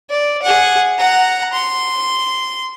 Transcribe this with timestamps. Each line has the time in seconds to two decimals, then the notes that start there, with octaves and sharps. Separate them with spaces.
0.10 D5
0.43 G#4 F#5
0.99 F#5 A#5
1.53 C6